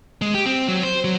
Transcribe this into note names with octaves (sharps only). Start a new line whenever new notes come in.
G#3
G4
C4
F#3
C5
F#3